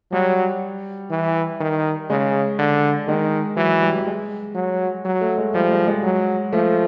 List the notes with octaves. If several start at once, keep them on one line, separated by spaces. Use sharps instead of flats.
F#3 G3
E3
D#3
C#3 G#3
D3
D#3 G#3
E3 F#3
G3
G3
G#3
F#3
F#3
A3
G#3
F3 G3
G#3
G#3
F#3
F3 A3